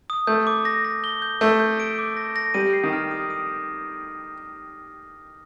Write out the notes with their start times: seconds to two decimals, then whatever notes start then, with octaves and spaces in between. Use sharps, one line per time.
0.10 D#6
0.27 A3 G6
0.47 D6
0.65 A#6
0.85 A#6
1.04 G7
1.22 G6
1.41 A3 G6
1.60 G6
1.80 D7
1.99 D6
2.17 A#6
2.36 A#6
2.54 G3 D#7
2.73 C7
2.84 D#3
2.93 F6
3.11 D#6
3.30 D#6